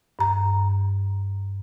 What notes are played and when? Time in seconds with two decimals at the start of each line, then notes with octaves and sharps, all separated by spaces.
0.19 G2 A#5